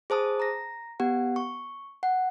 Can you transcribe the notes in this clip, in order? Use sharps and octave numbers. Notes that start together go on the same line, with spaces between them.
G#4 C5 A5 D#6
A#5 A#6
B3 G4 F#5
C#6
F#5